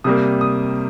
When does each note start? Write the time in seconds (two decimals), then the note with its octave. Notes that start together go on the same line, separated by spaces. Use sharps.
0.04 C3 G3 A#3 D#6
0.41 D#6